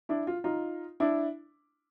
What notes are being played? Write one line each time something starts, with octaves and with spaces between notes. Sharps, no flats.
D4 E4
F4
D#4 F4
D4 E4